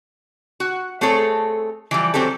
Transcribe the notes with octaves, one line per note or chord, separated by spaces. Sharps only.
F#4
A3 C4 G#4 A4 C#5
E3 F3 G3
E3 F#3 C4 G4 A4